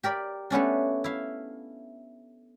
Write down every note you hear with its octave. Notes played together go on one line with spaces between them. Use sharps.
G4 A#4 D5 B5
A3 B3 C#4 D4
E4 F5